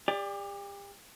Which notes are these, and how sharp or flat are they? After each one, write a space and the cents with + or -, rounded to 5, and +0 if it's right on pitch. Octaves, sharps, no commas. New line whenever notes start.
G4 +40 D5 +0